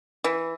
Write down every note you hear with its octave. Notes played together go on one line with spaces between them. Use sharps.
E3